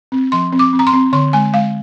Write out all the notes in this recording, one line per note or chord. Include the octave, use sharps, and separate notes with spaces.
C4
F3 C6
C4
D6
C4
A#5
C6
C4
D3 C6
G#3 G#5
G#3 F5